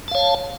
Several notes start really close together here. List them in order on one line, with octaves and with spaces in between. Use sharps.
A5 F5 C#5